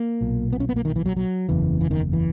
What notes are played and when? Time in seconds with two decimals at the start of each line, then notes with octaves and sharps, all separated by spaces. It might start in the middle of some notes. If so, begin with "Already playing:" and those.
Already playing: A#3
0.21 B1 A#2
0.53 B3
0.60 C#4
0.69 B3
0.76 A#3
0.85 D#3
0.96 E3
1.06 F#3
1.17 F#3
1.49 F#1 E2 C#3 E3
1.81 E3
1.91 D#3
2.13 E3